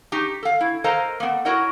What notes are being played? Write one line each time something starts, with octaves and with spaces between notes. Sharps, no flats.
D#4 G4
A4 F5
E4
A4 A#4 C5 D#5 F5 A#5
A#3 B3
E4 F#4 A#4 C#5 D#5 F#5